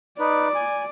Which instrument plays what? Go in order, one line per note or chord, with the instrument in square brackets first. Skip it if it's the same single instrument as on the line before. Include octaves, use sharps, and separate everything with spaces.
[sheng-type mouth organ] D#4 B4 [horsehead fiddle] D5
[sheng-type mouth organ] G#5